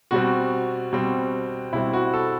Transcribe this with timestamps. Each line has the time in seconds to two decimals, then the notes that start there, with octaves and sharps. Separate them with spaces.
0.11 B2 G3 C4 F#4
0.92 B2 G3 C4
1.73 B2 G3 C4 E4
1.93 F#4
2.13 A4